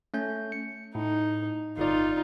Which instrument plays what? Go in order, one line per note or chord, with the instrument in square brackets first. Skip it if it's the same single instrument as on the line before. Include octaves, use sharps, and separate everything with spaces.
[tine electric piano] A3 C#4 G6
C#7
[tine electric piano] A2 [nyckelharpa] D#4
[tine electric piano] G1 D5 [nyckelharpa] D#4 F4